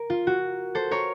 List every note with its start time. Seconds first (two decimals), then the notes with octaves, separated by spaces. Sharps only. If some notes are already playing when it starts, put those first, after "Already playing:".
Already playing: A#4
0.10 F4
0.27 F#4
0.75 A4 C5
0.91 A#4 C#5